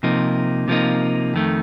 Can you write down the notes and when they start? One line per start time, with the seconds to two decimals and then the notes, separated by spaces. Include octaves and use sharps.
0.03 C3 F3 A#3 D#4
0.68 C3 F3 A#3 D#4
1.34 F2 D#3 A3